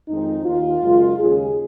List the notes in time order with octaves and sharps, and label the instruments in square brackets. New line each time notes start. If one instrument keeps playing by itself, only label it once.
[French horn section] F2 D#3 G#3 C4 D#4
D#2 D#3 A#3 D#4 F4
F#2 C#3 G#3
D#2 C#3 G#3 C#4 G#4